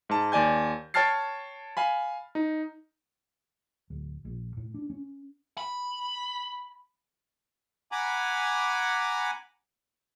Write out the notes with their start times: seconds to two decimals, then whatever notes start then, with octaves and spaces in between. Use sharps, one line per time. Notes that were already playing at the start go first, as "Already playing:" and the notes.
0.09 G#2 A5
0.32 D#2 D5 G#5 G6
0.94 C#5 G5 A5 F6 A6 C7
1.77 F5 G#5 B5
2.35 D#4
3.90 D1
4.25 A#1
4.57 A2
4.74 D4
4.90 C#4
5.58 B5
7.92 F#5 G#5 A#5 B5 D6